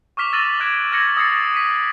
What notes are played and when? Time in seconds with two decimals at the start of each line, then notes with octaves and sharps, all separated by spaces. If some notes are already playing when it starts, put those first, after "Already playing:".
0.17 C#6 D6 F6 B6 E7 F7
0.33 E6 A6 A#6 D#7 E7 F#7
0.60 D6 F#6 G#6 D7
0.92 F6 G#6 A#6 C#7 F#7
1.17 D#6 E6 G#6 A6 C7 C#7
1.55 B6 D#7